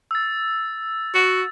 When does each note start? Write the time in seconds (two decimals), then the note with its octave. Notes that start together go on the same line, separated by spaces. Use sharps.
0.11 E6 A6
1.15 F#4